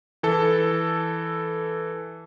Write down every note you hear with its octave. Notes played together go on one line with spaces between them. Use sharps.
E3 A4